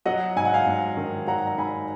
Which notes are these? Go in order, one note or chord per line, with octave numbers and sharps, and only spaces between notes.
F#3 D#5 F#5
G#2 G#5
F#5
F5 G#5
G#2
D#3
F#3 F#5 A#5
A#5
G#2 G#5 B5